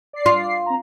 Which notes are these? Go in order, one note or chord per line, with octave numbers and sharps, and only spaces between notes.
D5 C7
F4
C4 A#5